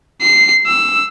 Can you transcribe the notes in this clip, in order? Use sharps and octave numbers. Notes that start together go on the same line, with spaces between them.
C7
E6